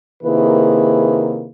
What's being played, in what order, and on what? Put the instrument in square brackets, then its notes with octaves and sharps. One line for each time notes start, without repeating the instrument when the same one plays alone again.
[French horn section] C3 D#3 A#3 E4 G#4 B4